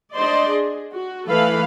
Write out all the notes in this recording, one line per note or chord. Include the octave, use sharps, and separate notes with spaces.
D4 C5 D5 D#5 C6
G#4
F#4
E3 A3 A4 B4 F5 B5